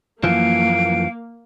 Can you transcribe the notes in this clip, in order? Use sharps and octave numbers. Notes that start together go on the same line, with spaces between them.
F#2 E3 F3 A#3 F5 D7